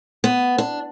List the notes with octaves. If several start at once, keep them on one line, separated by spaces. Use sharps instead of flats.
B3
D4